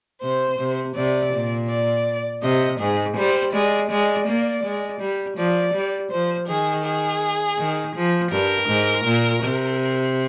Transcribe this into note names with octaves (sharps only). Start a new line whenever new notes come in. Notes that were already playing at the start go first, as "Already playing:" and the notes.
C3 C5
C3
C3 D5
A#2
D5
C3 D#5
G#2 G#4
G3 C5
G#3 D5
G#3 D5
A#3
G#3
G3
F3 D5
G3
F3 C5
D#3 G#4
G#4
D#3
F3
G2 A#4
G#2
A#2
C3